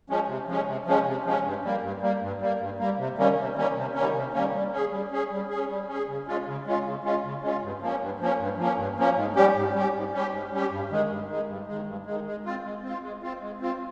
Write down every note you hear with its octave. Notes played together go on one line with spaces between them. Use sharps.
F3 G#3 C#4
C3
F3 G#3 C#4
C3
F3 G#3 C#4
C3
F3 G#3 C#4
G2
G3 A#3
G2
G3 A#3
G2
G3 A#3
G2
G3 A#3
C3
D#3 G3 A#3 C#4
C3
D#3 G3 A#3 C#4
C3
D#3 G3 A#3 C#4
C3
D#3 G3 A#3 C#4
G3
C#4 G#4
G3
C#4 G#4
G3
C#4 G#4
G3
C#4 G#4
C#3
G#3 C#4 F4
C#3
G#3 C#4 F4
C#3
G#3 C#4 F4
C#3
G#3 C#4 F4
G2
F3 A#3 C#4
G2
F3 A#3 C#4
G2
F3 A#3 C#4
G2
F3 A#3 C#4
G#2
G3 C#4 G4
G#2
G3 C#4 G4
G#2
G3 C#4 G4
G#2
G3 C#4 G4
G2
D#3 G#3
G2
D#3 G#3
G2
D#3 G#3
G2
D#3 G#3
G#3
C4 F4
G#3
C4 F4
G#3
C4 F4
G#3
C4 F4